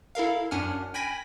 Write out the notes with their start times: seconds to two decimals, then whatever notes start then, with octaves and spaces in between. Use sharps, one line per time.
0.15 E4 A4 A#4 F5
0.51 F#2 C#4 D4 F#5 G#5 F6
0.94 G5 G#5 B5 G#6 A#6 B6